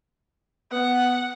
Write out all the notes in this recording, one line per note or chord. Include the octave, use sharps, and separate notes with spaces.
B3 F#5